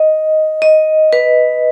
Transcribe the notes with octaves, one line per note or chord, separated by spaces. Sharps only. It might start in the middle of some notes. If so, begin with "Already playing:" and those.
Already playing: D#5
D#5
B4